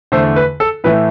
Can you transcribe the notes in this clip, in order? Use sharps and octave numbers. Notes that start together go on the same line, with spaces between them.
E2 D3 A3 C5
B4
A4
A2 E3 A3 B4